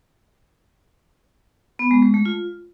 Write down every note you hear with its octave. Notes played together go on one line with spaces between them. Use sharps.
B3
G#3
G#3
A3
F4